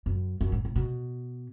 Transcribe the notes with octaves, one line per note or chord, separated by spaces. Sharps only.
F#2
F#2
G#2
A2
B2